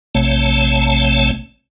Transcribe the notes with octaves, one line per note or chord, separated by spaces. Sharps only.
A#1 C3 A3 C4 C#5 A5